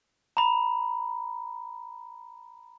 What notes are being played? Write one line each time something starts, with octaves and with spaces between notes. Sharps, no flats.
A#5 B5